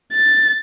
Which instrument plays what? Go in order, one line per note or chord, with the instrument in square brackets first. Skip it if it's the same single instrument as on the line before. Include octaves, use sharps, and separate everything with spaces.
[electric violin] A6